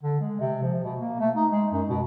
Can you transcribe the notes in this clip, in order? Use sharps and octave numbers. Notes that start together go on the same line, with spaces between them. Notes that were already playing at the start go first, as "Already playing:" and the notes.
D3
G#3
C3
F3
B2
A#3
A3
D#4
G#3
F#2
B2